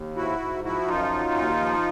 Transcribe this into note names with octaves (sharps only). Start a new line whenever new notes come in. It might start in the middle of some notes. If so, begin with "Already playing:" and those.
Already playing: D#2
G#2 E4 F#4
G#2
F3 E4 F#4
F#2 D#4 F4
F#3
D#2
F3